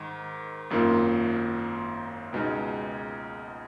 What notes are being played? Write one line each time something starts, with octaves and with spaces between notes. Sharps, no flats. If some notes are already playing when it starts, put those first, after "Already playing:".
Already playing: G#2 D#3
G#1 F#2 D#3 A#3 F4
C#2 B2 G#3 D#4